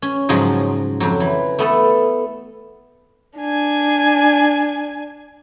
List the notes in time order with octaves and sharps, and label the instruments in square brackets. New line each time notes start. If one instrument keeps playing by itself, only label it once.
[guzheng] C#4
G#2 C#3 F3 F#3 G#3
F2 F#3
E3
A3 B3 A4
[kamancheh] D4 G#5